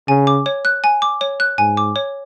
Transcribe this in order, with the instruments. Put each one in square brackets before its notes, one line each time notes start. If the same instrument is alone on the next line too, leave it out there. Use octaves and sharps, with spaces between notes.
[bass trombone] C#3 [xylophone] G#5
[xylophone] D6
C#5
F#6
G#5
D6
C#5
F#6
[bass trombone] G#2 [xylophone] G#5
[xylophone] D6
C#5